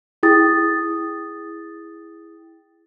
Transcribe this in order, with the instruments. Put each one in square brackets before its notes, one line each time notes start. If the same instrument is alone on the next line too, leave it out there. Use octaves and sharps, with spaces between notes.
[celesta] E4 G#4 G5 D#6 A6